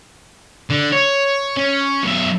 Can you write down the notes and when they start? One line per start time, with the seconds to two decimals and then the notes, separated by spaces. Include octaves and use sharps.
0.70 D3
0.92 C#5
1.57 C#4
2.04 B1 E5